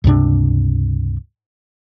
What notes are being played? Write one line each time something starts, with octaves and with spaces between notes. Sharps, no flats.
C#2 G2 C3 D4